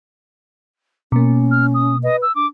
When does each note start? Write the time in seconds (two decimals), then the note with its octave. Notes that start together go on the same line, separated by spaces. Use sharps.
1.12 B2 A#3 C#4
1.51 F6
1.74 D#6
2.03 B4 D#5
2.22 E6
2.35 D4 D6